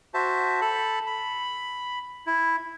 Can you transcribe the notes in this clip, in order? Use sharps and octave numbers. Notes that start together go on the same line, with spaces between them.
F#4 C5 E5 A5
A4 A5 B5
B5
E4